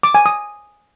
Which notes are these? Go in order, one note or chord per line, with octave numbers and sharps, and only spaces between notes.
D6
G#5
D#6